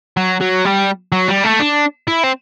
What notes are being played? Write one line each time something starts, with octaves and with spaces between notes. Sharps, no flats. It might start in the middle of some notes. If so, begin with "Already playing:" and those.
F#3
F#3
G3
F#3
G3
A3
D4
E4
C4